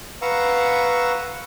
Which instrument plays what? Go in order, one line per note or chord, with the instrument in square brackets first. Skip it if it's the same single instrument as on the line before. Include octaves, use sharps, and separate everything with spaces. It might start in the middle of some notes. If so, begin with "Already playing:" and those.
[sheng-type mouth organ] B4 F5 F#5 A#5 C#6 E6